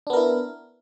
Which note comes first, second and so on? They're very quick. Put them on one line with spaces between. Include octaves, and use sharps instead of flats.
D4 B3 A#4 E4